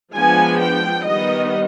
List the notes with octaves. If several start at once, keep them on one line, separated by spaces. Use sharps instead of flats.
F3 G#3 B3 D4 G#5
G5
D#3 G3 B3 D#5